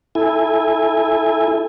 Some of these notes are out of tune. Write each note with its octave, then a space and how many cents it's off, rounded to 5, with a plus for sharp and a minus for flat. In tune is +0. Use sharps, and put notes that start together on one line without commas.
E4 +0 A4 -5 G#5 -20